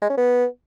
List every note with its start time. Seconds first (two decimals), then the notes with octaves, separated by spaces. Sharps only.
0.02 G#3
0.10 C#4
0.17 B3